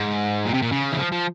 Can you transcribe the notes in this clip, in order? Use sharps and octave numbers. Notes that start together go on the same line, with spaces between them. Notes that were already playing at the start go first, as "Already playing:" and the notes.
Already playing: G#2
A#2
C3
A#2
C#3
E3
F3
F3